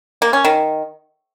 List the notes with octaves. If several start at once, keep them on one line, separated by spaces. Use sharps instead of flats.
A#3
C#4
D#3